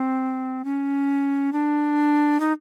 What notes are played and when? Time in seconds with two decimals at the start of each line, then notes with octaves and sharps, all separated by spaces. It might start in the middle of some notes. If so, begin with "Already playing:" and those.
Already playing: C4
0.65 C#4
1.53 D4
2.40 D#4